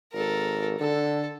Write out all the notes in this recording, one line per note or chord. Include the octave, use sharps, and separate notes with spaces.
G#1 A4 A#4
D3 A4